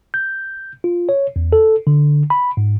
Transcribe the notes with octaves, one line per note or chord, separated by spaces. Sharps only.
G6
F4
C#5
E2
A4
D3
B5
G#2